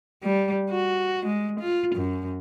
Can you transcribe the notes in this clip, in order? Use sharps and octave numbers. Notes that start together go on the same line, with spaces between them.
G3
F#4
G#3
F4
F#2